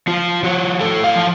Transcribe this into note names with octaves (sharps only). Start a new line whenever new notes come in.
F3 F4
F3 F#4
A2 A4
F5
F3